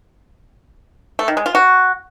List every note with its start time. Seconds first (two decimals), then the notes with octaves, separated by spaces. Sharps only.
1.19 A3
1.28 D#3
1.37 G#3
1.46 F4
1.55 F#4